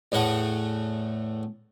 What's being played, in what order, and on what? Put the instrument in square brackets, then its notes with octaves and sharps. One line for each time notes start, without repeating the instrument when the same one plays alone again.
[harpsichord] E2 A2 A3 F#5